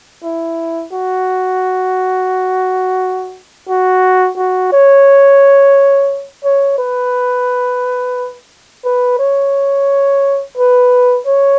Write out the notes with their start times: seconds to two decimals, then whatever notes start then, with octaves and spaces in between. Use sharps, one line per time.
0.24 E4
0.92 F#4
3.69 F#4
4.38 F#4
4.72 C#5
6.44 C#5
6.78 B4
8.85 B4
9.19 C#5
10.57 B4
11.26 C#5